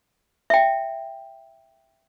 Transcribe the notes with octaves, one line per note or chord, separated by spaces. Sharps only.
E5 G5